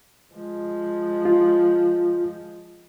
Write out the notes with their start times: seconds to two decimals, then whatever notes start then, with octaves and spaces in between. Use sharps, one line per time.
0.33 F3 G#3
1.25 F4